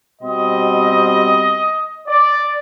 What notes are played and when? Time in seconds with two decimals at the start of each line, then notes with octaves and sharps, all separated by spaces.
0.22 B2 G3 C4 D#5
2.07 D5